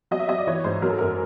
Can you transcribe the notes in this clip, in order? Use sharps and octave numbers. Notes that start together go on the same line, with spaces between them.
F#3 D#5
E5
F#3 D#5
D5
E3 C#5
G#2 C5
F#3 A#4
A4
F#2 A#4